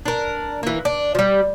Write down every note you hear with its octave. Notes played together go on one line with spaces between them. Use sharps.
D4 A#4
E3 A#3
D4
F3 G3